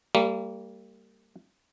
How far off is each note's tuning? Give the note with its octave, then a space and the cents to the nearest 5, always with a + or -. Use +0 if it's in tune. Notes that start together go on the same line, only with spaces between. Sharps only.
G3 +0 A#3 -35